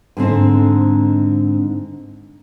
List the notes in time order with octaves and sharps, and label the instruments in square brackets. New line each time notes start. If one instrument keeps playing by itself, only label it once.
[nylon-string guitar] G#2 D3 C4